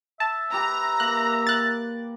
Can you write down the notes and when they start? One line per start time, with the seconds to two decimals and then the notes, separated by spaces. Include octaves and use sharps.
0.20 E5 A5
0.52 G4 B4 A#5
1.00 A#3 F#6
1.47 A#4 F#6 A6